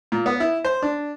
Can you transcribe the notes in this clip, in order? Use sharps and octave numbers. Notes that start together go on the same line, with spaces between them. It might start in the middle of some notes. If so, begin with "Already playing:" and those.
A#2
B3
E4
C5
D4